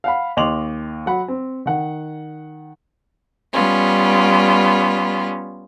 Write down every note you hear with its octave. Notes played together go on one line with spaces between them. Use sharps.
F5 F#5 B5
D#2 D#5 C6 D6 F7 F#7
F#3 F#5 B5
C4
D#3 F#5
G3 B3 C#4 F4